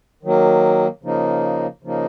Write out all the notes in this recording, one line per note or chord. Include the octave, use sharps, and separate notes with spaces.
D#3 F#3 A#3
C#3 F3 A#3 D#4
C#3 F3 A#3 D#4